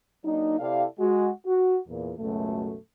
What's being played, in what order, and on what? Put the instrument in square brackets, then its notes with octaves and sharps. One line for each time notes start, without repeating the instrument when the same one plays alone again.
[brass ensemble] F#3 A#3 D4 D#4
C3 E4 G4 A4 D5 F5
G#3 F#4
F#4
E2 A#2
C#2 F#2 B2 A3